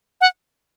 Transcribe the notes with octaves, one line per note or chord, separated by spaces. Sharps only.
F#5